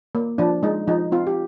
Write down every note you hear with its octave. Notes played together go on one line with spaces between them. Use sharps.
A#3
F3 D4
G#3 D#4
F3 D#4
C4 F4
G4